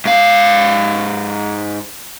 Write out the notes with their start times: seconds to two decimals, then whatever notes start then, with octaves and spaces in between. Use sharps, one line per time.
0.05 G#2 F5